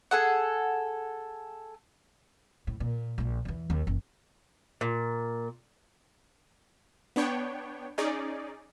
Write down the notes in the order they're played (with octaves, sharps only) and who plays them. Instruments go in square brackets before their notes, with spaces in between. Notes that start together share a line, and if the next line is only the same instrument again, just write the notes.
[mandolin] G#4 A4 F#5
[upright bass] A2
A#2
A#1 A#3
E2 E3
D#2
F#1 E3
[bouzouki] A#2
[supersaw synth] B3 D4 C#5 G5
C#4 D#4 G#4 D5